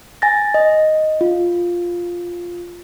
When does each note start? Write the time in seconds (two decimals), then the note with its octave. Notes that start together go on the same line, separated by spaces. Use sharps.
0.22 G#5 A6 A#6
0.54 D#5
1.21 F4